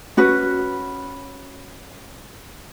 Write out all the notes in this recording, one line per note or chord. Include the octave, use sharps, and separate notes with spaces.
C#4 F#4 B4